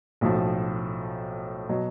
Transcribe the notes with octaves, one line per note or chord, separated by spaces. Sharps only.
B1 A2 F3
B2 F#3